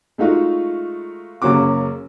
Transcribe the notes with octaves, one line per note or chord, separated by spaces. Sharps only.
G#3 A3 D#4 F4 F#4
F#1 C#3 A#3 C#4 F#4 D6